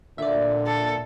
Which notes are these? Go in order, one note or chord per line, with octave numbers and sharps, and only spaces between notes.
A#2 D3 D5 E5
A4